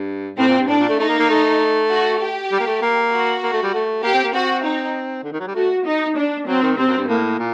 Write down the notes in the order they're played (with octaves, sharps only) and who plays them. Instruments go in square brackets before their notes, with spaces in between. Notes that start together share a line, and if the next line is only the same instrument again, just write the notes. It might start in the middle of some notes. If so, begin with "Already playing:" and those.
Already playing: [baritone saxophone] G2
[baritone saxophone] A2 [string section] C4
[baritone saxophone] A#2
G2
[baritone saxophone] A2 [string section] D4
[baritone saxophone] A#2
A3
[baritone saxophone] A3 [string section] D#4
[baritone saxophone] A#3
A#3
A3
[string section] F#4
G4
[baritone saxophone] G3
A#3
A3
A#3
[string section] F#4
[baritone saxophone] A#3
A3
G3
A3
[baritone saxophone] A#3 [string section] G4
[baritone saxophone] C4
A#3
[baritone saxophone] C4 [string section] F#4
[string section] D#4
[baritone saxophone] D3
D#3
F#3
G3
[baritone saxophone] A3 [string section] F#4
[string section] D#4
D4
[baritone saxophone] F#3 [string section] C4
[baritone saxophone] D#3
[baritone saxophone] C3 [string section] C4
[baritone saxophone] F#2
G2
[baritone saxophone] A2 [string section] A#3
[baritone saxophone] A#2